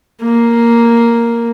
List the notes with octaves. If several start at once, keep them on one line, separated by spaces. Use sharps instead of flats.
A#3